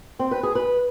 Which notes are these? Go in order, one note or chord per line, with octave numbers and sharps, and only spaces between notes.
C4
B4
G#4
B4